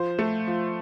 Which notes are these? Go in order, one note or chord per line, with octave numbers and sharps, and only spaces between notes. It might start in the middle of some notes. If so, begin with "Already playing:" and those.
Already playing: F3 C5
A3
F3